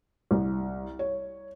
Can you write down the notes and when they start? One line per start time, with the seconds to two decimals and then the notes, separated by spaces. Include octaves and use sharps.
0.31 C2
0.99 C#5